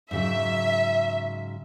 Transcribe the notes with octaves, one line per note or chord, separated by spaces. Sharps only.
G#2 C#3 F#3 E5